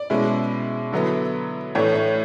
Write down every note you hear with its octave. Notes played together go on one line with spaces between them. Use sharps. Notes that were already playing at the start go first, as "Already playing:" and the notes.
Already playing: D5
B2 G#3 C#4 E4
D3 F#3 B3 E4
A2 E3 A3 D4 C#5
C#5